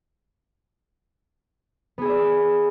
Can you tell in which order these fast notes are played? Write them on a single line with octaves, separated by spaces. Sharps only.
B3 G#4 E5 D5